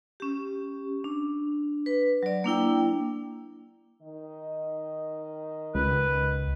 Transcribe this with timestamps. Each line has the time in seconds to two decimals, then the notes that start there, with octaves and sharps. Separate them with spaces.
0.20 C#4 G4
1.04 D4
1.86 B4
2.23 F#3 D5
2.44 A#3 D4 E4 G5
4.01 D#3 D#5
5.75 C#2 B4